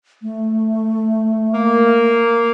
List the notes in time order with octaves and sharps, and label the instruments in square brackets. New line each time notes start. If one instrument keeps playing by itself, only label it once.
[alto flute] A3
[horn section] A#3